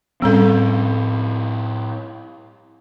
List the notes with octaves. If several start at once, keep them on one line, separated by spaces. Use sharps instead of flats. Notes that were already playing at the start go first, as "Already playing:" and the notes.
A2 G3 C4 C#4 A4